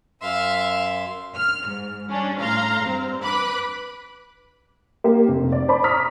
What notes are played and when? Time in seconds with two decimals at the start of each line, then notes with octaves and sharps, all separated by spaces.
0.22 F#2 E5 F5 C6
1.35 F6
1.67 G#2
2.09 G3 C#4 D4
2.40 A2 F5 A#5 C6
2.83 G2 C4
3.23 B4 B5 D6 F#6
5.04 A#3 G4
5.28 F1
5.52 D5
5.68 C5 A5 B5 D6
5.84 A#5 C#6 D#6 F6 B6